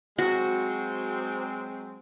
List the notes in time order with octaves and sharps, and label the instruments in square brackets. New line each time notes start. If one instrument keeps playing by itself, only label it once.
[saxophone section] F#3 G#3 C4 [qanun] F#4